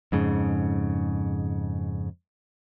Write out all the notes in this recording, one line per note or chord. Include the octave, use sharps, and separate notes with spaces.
F2 G#2 C#3